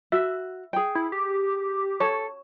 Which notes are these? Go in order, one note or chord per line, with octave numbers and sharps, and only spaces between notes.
F#4 E5
G#4 G5
E4
G4
A4 C#5